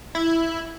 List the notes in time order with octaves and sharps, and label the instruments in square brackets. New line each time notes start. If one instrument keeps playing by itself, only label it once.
[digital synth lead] E4